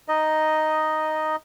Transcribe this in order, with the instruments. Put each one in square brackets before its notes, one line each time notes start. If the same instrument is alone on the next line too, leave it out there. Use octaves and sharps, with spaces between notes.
[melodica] D#4 D#5